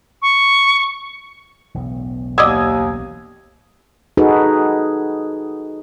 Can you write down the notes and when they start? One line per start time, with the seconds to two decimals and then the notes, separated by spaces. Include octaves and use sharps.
0.22 C#6
1.74 E1 B1 A2
2.38 D#2 F#3 D5 D#5 D#6 E6 G#6
4.17 D#4 F#4 G#4 A4 B4